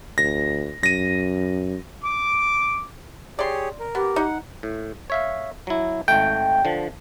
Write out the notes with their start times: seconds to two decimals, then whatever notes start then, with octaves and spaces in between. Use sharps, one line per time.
0.18 D2 A#6
0.83 F#2 A#6 D#7
2.02 D6
3.39 G4 G#4 C#5 D5 C6
3.80 A#4
3.95 B3 G4
4.16 D#4 F#5
4.63 A2
5.10 C#5 E5 F5
5.67 F#3 E4
6.08 G#1 A3 G5
6.65 D3 F3